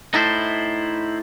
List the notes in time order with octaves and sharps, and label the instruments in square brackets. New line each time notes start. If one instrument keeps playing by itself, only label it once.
[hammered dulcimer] A2 A5 [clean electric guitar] D#4 E4 C5